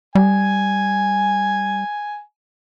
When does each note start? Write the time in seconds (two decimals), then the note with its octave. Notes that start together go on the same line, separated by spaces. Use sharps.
0.15 G3 G#5